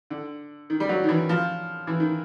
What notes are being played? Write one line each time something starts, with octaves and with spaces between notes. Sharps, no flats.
D3
D#3
G3
F#3
D#3
E3
F3
E3
D#3